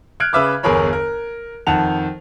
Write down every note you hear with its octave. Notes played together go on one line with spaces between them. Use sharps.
F6 F#6 G#6 D7
C#3 B4 E5 D6 F6
G1 E2 G#4 A#4 C#5 B5
A#4
F2 D#3 F#5 A5 F7